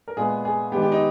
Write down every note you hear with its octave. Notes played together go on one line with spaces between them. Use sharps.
A#4
A#2 G#3 B3 G#4
G#4
D#3 G#3 B3 G4
G4
D#4